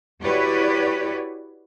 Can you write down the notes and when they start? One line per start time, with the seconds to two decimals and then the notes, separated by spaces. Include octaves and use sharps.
0.23 E4 F#4 G4 B4 C#5 D5